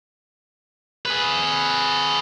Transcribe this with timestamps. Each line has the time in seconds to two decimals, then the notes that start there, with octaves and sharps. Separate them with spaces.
1.06 G#4 B4